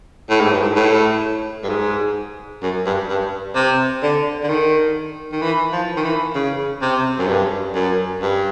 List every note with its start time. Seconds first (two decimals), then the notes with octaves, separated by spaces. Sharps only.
0.29 A2
0.41 G#2
0.52 G2
0.62 G#2
0.76 A2
1.63 G2
1.69 G#2
2.63 F#2
2.86 G2
3.09 G2
3.55 C3
4.02 D3
4.43 D3
4.49 D#3
5.32 D#3
5.42 E3
5.72 F3
5.97 D#3
6.04 E3
6.35 C#3
6.82 C3
7.18 F#2
7.28 G2
7.74 F#2
8.21 G2